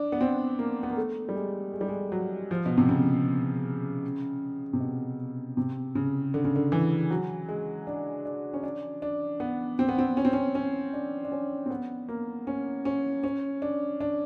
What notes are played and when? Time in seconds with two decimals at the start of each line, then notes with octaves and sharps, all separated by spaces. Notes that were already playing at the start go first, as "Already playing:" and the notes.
Already playing: D4
0.12 B3
0.21 C4
0.59 A#3
0.83 B3
0.90 A#3
0.97 A3
1.29 G3
1.35 G#3
1.74 G#3
1.81 G3
1.88 G#3
2.12 F#3
2.51 F3
2.66 B2
2.77 C3
2.89 C#3
4.73 C3
4.80 B2
5.57 C3
5.95 C#3
6.34 D3
6.44 C#3
6.56 D3
6.72 E3
7.11 F#3
7.49 G#3
7.87 D4
8.25 D4
8.54 C#4
8.63 D4
9.02 D4
9.40 B3
9.79 C4
9.89 B3
9.99 C4
10.17 C#4
10.25 C4
10.33 C#4
10.55 C#4
10.93 D4
11.25 D4
11.32 C#4
11.66 C4
11.70 B3
12.09 A#3
12.47 C#4
12.85 C#4
13.24 C#4
13.62 D4
14.01 D4